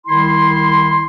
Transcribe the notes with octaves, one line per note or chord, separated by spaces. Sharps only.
C2 D#3 E4 C6